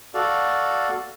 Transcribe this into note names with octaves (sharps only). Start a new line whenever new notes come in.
F#4 A4 D5 F5